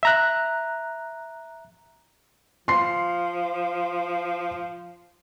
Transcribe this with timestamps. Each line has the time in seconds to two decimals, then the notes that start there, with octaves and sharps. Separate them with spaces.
0.03 E5 A#5 F#6
2.68 F3 C6 C7